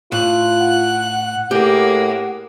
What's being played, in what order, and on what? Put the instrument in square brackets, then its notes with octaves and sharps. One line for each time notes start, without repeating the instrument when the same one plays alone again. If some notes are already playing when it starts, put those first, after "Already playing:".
[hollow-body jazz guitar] A2 [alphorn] F4 [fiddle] F#6
[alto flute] F#5
[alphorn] A2 [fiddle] A#3 G#4 [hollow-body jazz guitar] G4